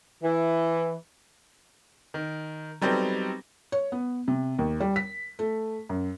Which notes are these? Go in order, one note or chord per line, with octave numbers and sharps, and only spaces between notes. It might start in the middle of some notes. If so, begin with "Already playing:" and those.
E3
D#3
F#3 G3 B3 C4 D#4 A4
C#5
B3
C3
D#2
G3
B6
A3
F#2